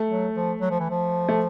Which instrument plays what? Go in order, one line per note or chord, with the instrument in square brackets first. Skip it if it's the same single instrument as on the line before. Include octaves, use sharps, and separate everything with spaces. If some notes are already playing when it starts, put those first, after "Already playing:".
Already playing: [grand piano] A3
[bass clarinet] F#3
F3
F#3
F3
E3
F3
[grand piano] A3